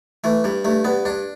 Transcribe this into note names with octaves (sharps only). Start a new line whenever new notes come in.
E3 A3
G2 G3
G2 A3
G2 B3
G2 D4